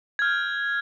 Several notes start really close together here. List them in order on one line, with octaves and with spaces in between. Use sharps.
G#6 F6 G6